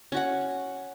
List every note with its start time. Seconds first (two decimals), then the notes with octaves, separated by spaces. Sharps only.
0.12 C#4 F#4 F#5